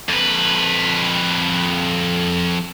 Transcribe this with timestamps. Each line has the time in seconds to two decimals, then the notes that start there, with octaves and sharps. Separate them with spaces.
0.09 F2 B4